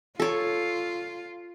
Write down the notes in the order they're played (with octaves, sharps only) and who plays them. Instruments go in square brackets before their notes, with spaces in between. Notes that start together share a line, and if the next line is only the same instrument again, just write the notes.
[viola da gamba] F4 [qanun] A4 C#5